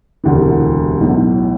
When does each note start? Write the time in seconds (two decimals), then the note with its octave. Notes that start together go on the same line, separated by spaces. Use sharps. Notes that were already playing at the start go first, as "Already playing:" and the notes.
0.24 E1 D2 C3 E3
1.01 B1 A2 E3